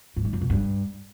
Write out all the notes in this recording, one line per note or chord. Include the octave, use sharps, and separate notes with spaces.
G#2
D#3
F#2
B2
G2